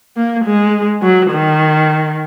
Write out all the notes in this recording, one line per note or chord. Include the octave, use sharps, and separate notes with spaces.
A#3
G#3
F#3
D#3